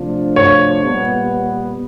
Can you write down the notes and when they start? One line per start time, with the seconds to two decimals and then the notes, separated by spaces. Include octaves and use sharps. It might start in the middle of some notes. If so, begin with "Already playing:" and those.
Already playing: C3 F3 A3 D4 F4
0.36 C#5
0.83 A#2 G3 B3